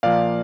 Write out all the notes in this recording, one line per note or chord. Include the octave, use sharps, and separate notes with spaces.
A#2 F3 A#3 D5 F5